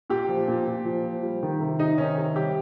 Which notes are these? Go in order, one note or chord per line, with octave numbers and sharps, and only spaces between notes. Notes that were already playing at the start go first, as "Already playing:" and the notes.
A#2 G4
F3
A#2
A#2
F3
F3
G3
D#3
C3
C3 D#4
D#3 C#4
C3
G3 G4